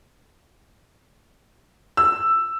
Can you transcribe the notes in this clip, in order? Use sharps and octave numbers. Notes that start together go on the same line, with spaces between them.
E6